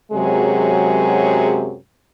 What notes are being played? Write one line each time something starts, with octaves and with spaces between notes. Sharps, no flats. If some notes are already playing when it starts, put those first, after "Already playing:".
F#2 C3 F#3 G#3 G#4